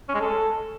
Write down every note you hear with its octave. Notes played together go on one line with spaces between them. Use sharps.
C#4
G#3
A4